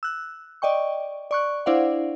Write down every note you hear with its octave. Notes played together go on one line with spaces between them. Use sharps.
E6 F#6
D5 D#5 G5 C#6
D5 C#6 F#6
D4 E4 C5 D5 F5 F#5